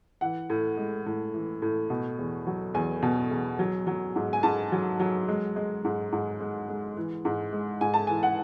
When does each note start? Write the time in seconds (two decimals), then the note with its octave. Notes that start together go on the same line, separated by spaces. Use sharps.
0.21 E3 F#5
0.50 A2
0.77 G#3
1.06 A2
1.34 E3
1.62 A2
1.90 B2
2.19 E2
2.47 F#3
2.74 E2 G#5
3.02 B2
3.31 E2
3.59 F#3
3.87 F#3
4.16 G#2
4.33 G#5
4.43 G#2 A5
4.72 F#3
5.00 F#3
5.28 G#3
5.56 G#3
5.85 G#2
6.13 G#2
6.40 G#3
6.69 G#3
6.97 E3
7.25 G#2
7.53 G#3
7.81 G#2 G#5
7.94 A5
8.07 E3 G#5
8.23 F#5